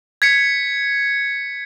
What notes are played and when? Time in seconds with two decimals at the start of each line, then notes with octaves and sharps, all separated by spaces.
0.22 G#6 B6 C#7